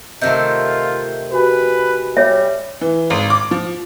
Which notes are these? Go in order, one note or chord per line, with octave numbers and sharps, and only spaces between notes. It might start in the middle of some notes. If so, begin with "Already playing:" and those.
C3 D#3 A3 F4 D#5 E5 G6
F#4 G4 B4 G#5
G3 C#5 E5
E3
G#1
D6
F3